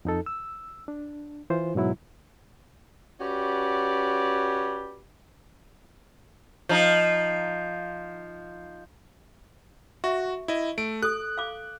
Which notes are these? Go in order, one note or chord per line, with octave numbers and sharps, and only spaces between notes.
F2 D#4 A4
E6
D4
E3 F4 C5
G#2 B2 F#3 E4
C#4 F#4 G4 B4 D5
F3 D#4
F#4 E5 C#6
E4 D#5
A3 D7
A4 D#6 F#6
F5 D6